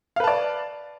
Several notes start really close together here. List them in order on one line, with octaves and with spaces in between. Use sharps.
F5 B4 A5 D5